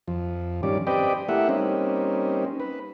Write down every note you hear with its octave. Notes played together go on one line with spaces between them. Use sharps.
F2 F3
G2 D#3 F3 G3 C#4 D5
C4 G4 B4 D5 D#5 G5
A3 A#3 E4 G4 E5 F#5
G3 A#3 C4 C#4 D#4
B4